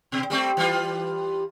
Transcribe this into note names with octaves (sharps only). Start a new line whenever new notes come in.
B2
G3 A3 C4
E3 G3 F4